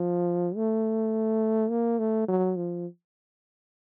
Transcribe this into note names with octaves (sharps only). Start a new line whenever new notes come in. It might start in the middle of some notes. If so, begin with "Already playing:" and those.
Already playing: F3
A3
A#3
A3
F#3
F3